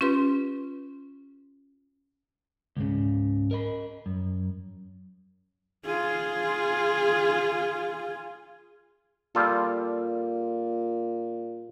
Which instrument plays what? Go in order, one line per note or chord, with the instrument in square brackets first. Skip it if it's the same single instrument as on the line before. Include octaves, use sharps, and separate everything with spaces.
[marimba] C#4 F4 G4 B4 C6
[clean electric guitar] C#2 G#2 C#3
A#4 D#5 B5
F#2
[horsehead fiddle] F4 G#4
[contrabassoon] A#2 [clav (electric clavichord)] G3 F4 A4